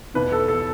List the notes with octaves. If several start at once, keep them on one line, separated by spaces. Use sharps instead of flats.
E2 B2 B4
A4
A4